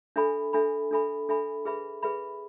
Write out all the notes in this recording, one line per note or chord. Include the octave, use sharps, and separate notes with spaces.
D4 A4 E5 G#5 B5
D4 A4 E5 G#5 B5
D4 A4 E5 G#5 B5
D4 A4 E5 G#5 B5
G#4 B4 E5 B5
G#4 B4 E5 B5